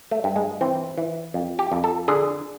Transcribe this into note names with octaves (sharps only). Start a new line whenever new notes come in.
A3
G2
G#3
E3 C4
E3
F2
G4
F2
A4
D3 G#4